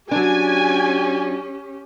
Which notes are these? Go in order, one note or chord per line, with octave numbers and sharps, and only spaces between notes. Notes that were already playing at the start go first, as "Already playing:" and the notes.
F#3 C#4 D4 G4 G#5